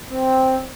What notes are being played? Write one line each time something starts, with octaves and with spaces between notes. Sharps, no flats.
C4